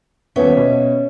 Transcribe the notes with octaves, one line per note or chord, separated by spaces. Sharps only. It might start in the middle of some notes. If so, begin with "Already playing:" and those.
D#1 B3 C#4 C#5 E5
B2